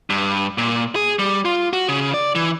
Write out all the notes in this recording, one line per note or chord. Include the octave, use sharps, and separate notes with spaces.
G2
A#2
G#4
G3
F4
F#4
C#3
D5
E3